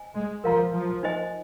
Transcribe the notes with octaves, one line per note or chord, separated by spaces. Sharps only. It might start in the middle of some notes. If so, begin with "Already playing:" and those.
Already playing: C5 D#5 G#5
G#3
F3 A#4 F5 A#5
F3
D#4 C5 D#5 G#5